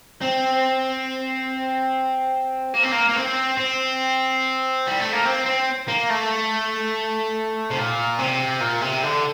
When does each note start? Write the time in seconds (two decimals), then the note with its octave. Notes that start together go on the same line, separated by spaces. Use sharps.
0.21 C4
2.74 A#3
2.83 C4
2.92 A#3
3.09 A#3
3.16 C4
3.57 C4
4.87 G3
5.00 A3
5.13 A#3
5.25 C4
5.46 C4
5.88 A#3
6.10 A3
7.71 C3
7.78 A#2
8.19 C3
8.61 A#2
8.82 C3
9.03 D3